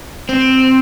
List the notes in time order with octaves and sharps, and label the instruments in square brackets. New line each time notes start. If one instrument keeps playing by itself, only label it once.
[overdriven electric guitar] C4